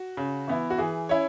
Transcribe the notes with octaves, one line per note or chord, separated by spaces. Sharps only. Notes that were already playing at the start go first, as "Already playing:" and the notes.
Already playing: F#4
C#3
E3 B3 E4
F#4
E3 G#4
C#4 E4 C#5